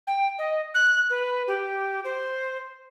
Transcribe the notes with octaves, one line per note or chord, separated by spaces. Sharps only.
G5
D#5
F#6
B4
G4
C5